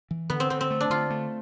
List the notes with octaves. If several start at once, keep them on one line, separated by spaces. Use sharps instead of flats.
E3
D3 B3
C4
D3 C4
C4
A3
D4
D3 F4
A3